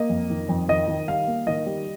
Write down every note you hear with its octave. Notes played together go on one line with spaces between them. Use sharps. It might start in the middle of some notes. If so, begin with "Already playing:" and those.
Already playing: A#3 D#5
F2
D#3
F2
D#3 D#5
D#3
G3 F5
A#3
D#3 D#5
G3